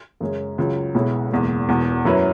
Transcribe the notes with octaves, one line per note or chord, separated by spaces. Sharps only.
F#2 C#3 G#3 C#4
C#2 C#3 F#3
B1 B2 G#3 E4 C#5
F#1 E2 B2 G#3
E1 E2 B2
F#2 F#3 C#4 E4 B4